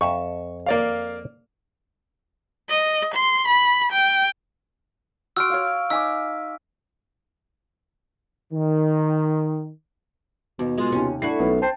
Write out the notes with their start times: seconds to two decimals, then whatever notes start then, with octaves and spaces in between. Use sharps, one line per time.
0.01 F2 E5 A5 C#6
0.66 A#3 D5 F5
2.69 D#5
3.14 C6
3.48 B5
3.92 G5
5.37 F#4 C6 E6 F6 D7
5.50 C#5 F5
5.90 D#4 G#5 D6 E6 B6
8.53 D#3
10.59 D#2 B2
10.78 G#3 F4
10.92 D#2 C3 C#4
11.22 A3 D4 E4 F#4 C7
11.40 B1 B3 C#4
11.62 C5 G5 A5